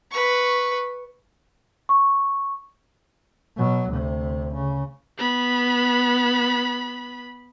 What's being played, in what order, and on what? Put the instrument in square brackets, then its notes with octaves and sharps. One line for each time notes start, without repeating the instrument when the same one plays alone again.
[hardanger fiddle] B4 C#6
[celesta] C#6
[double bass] B2 F#3
D2 C3
C#3
[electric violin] B3 B5